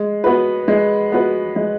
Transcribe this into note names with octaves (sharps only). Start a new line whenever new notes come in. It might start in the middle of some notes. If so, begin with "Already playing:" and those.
Already playing: G#3
B3 F#4 B4
G#3
B3 F#4 B4
G#3